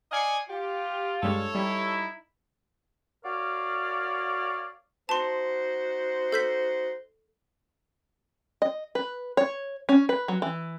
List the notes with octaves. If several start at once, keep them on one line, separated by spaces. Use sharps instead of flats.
D5 D#5 F5 G#5 C7 C#7
F4 G4
G2 G3 G#3 A4 C#5
G3 D#4 E4
F#4 A#4 C#5 D5 F5
D#4 F#4 C5 A5 C6
A4 G6 B6
D#5
B4
C#5
C#4
B4
F#3
E3